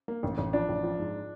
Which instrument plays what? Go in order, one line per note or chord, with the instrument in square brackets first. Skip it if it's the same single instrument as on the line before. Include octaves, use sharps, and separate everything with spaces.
[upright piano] A#3
A1
A1
[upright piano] F3 [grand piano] D4
[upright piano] A1
F3
G#2